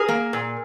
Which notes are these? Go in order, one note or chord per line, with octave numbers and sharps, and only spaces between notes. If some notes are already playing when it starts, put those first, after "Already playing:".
Already playing: G#4 A#4
A#3
A#2